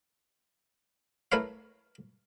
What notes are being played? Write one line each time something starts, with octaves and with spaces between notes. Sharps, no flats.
A3 E4 A#4 B4 C#5 F5